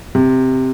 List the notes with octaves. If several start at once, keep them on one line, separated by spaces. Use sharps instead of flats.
C3